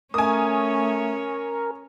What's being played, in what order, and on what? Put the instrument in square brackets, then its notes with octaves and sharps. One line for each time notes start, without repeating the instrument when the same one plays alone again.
[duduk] A3 [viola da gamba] C#4 C#5 [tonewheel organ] A#4 [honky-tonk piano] G#5 D#6